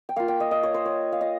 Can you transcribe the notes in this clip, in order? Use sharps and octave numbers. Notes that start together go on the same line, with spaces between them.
G5
A#3 F4 F5
G5
D#5
D#5
C#5
C5
C#5
F5
D#5